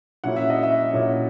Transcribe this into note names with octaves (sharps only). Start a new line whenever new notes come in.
A#2 F#3 C#4 E4 F#5
E5
D#5
E5
A#2 F#3 C#4 E4